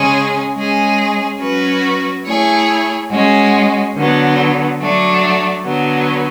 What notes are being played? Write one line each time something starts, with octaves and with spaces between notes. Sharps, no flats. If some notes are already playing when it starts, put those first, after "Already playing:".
Already playing: C#3 G#3 C#4 G#4
G#3 C#4 G#4
F#3 C#4 F#4 B4
A3 E4 G#4 C#5
G#3 C#4 F#4
D3 F#3 B3
F#3 A3 D4
D3 F#3 B3